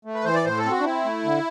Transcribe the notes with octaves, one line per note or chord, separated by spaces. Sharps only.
A3
B4
E3 C5
D5
A2 C5
A4
C4
F#4
D4
C4 E4
A3
D3